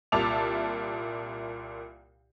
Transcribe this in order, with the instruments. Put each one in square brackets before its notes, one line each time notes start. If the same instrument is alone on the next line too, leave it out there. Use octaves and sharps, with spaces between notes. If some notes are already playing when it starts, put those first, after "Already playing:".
[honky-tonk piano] C2 A#2 E5 A5 D6 F7